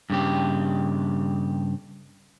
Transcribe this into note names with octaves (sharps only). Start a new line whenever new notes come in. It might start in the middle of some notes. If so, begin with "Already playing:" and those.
G2 C#3 G4